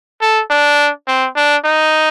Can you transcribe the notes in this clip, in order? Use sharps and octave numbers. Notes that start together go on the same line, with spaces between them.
A4
D4
C4
D4
D#4